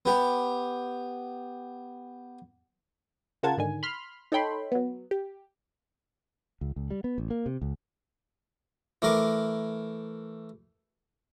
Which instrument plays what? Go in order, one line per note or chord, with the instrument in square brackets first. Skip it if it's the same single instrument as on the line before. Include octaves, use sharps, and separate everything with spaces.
[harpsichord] B3 G4
[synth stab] C#3 F4 A#4 F#5 A5 G#6
G#2 D3 D#3 G#5
B5 C6 F6
D#4 A4 C#5 G5 B5 C6
F#3 B3
G4
[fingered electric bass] C#2
C#2
G3
B3
A1
A#3
C3
C#2
[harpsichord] E3 A3 A#4 D6